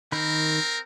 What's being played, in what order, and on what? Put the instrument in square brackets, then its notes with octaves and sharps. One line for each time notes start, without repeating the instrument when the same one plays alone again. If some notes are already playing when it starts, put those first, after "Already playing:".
[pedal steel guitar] D#3 B5 G6 [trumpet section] C4 A#4